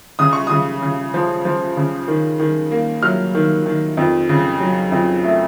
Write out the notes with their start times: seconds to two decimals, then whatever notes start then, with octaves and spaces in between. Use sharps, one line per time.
0.19 C#3 D#6
0.33 C#6
0.47 C#3 D#6
0.82 C#3
1.14 F3
1.45 F3
1.77 C#3
2.08 D#3
2.40 D#3
2.71 A#3
3.03 F#3 F6
3.35 D#3
3.66 D#3
3.97 F2
4.29 C#3
4.61 F#3
4.92 F2
5.24 A3